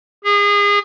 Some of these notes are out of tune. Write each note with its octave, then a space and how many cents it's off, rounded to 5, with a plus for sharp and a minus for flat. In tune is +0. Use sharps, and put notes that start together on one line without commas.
G#4 -30